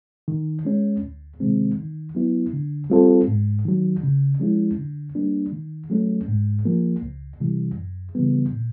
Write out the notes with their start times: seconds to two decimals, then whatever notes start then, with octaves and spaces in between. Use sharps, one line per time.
0.28 D#3
0.65 G#3 C#4
1.03 D2
1.40 C3 D#3 G#3 C4
1.78 D#3
2.15 F#3 B3 E4
2.53 D3
2.90 G3 C4 F4 A4
3.28 G#2
3.65 D#3 F#3
4.03 C#3
4.40 F3 G#3 C#4 E4
4.78 D3
5.15 G3 A#3 D4
5.53 D#3
5.90 F#3 A3 C#4
6.28 G#2
6.66 F3 A#3
7.02 C#2
7.40 C3 E3 G3
7.78 F#2
8.15 C#3 E3 G3 B3
8.53 A#2